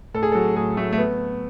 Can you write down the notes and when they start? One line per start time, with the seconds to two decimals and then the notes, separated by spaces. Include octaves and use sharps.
0.14 A2 A4
0.23 G#4
0.32 F#3 A4
0.56 A2 G#4
0.77 F#3 A3
0.92 A3
0.98 B3